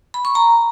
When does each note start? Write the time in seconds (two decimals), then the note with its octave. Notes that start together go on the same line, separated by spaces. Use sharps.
0.14 B5
0.25 C#6
0.35 A#5